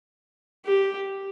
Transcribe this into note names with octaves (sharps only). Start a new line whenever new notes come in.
G4